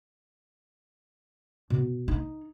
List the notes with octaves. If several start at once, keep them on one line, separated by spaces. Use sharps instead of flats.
B2
D#4